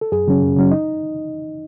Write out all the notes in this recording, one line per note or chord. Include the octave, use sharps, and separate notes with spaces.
A4
F#2 G#4
C#3 F#3 C#4
F#2
C#3 F#3 C#4
D#4 D#5